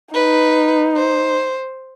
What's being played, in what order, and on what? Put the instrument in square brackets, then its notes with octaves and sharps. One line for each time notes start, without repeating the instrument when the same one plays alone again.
[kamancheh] D#4 [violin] B4
[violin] C5